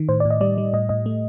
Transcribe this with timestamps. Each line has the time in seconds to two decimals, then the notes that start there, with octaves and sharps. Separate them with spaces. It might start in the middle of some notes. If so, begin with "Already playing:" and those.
Already playing: D#3
0.09 A2 C5
0.20 D5
0.25 A2
0.30 D#5
0.41 G3 D5
0.58 G3
0.73 A2 D#5
0.89 A2 D#5
1.06 A3